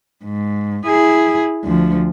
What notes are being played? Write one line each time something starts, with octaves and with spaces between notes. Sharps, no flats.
G#2
E4 G#4
D2 F3